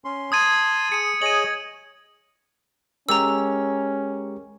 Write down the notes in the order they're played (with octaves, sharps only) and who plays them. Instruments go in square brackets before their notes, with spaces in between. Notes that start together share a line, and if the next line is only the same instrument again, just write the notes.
[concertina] C#4 C6
[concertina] A5 C6 [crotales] D#6 G#6 D#7
[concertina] G#4 [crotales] C#7 D#7
[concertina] G#4 C#5 D#5 [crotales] D#7 F#7
[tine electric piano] G#3 G4 A#4 [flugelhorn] C#4 [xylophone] A#5 E6